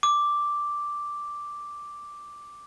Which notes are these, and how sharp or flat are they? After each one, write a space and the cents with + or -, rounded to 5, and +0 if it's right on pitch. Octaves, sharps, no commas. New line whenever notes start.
D6 +0